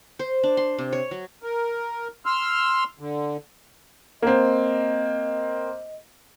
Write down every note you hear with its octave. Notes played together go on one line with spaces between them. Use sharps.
C5
D4
C6
C3
C#5
F#3
A#4
C6 E6 F6
D3
A#3 C4 D#5